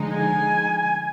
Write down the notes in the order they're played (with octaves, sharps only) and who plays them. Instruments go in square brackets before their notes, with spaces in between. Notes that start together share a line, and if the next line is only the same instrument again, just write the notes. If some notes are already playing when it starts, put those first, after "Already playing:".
Already playing: [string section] D3 F3 G#3 D#4
[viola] G#5